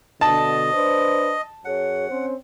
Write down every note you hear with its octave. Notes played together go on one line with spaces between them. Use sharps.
B2 D3 D#5 A5
D4 B4 C5
F#2 G#4 C#5 F#5
C4 C#4 C5